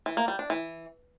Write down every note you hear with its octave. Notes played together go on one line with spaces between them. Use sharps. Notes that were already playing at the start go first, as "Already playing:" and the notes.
E3
A#3
G3
D4
E3